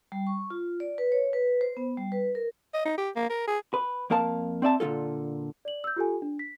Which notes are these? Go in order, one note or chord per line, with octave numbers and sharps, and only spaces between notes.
G3
C#6
F4
D5
B4
C#5
B4
C5
B3
G3
B4
A#4
D#5
D#4
G4
A#3
A#4
G#4
B4
F2 A#3 A#4 F5 A5
C4 D5 E5 A5
A#2 D3 C4 F4 A4
D5 F#7
E6 G6
F4 G4 A4 G#5
D4
B6